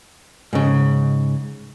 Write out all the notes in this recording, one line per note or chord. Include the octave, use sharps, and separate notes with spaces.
G#2 C#3